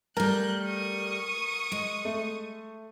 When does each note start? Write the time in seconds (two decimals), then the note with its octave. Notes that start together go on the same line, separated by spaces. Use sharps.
0.17 G3 A3 A#4 F#6 G6
0.65 C#6 D#6
1.72 G#3
2.05 A3